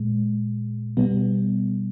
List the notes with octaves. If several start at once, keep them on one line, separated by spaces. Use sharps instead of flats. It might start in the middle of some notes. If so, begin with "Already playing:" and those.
Already playing: A#2 G#3
B2 G3 B3